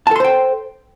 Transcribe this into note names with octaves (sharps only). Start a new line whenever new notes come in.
A4 C5 G5 A5 C6